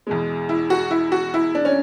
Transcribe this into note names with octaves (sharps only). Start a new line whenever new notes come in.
E2 B2 G#3
E4
F#4
E4
F#4
E4
D4
C#4